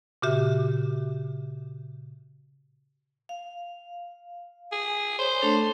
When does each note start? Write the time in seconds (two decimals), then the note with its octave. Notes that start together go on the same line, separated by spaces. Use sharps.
0.22 A#2 C#3 F#4 G4 E5
3.29 F5
4.72 G#4
5.19 C5 C#5
5.42 A3 D4 A4